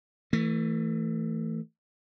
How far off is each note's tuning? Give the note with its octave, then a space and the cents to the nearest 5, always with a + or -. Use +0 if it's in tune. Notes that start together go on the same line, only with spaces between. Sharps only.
E3 -5 A3 +30